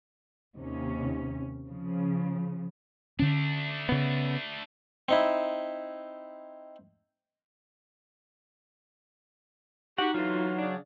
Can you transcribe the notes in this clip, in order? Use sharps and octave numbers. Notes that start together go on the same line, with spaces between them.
D#2 C3 C#4
C#3 F3
D3 A3 C#4 D4
C#3 B3
C4 D#4 E4
D#4 F#4 G4 F#5
D3 E3 F#3 F4 F#4
C#3 D4